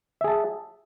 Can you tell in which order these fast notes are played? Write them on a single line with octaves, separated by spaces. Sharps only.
E5 G#4 A5